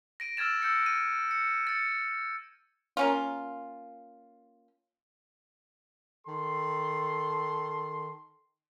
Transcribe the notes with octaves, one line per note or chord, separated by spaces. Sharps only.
A#6 D7 D#7
E6 F6 G#6 A6 E7
E6 G6 A6 C#7
D#7
C#7
A6 C#7
A#3 C#4 F4
D#3 A4 C6